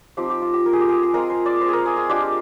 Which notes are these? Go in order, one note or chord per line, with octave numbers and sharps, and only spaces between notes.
F3 C4 D#4 G4
G4
F4
G4
A#4
G#4
G4
G#4
G#4
G#3 C4 F4 A#4
C5
D5
C5
G#4 A#4
G#4
G#4
G#3 D4 F4 G4